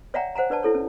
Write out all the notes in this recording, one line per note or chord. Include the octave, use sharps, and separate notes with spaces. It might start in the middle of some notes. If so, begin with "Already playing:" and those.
C#5 D5 E5 F#5 G5 A#5
C5 F#5 G#5 A#5
D4 B4 D5 A5
E4 A4 C#5
C#4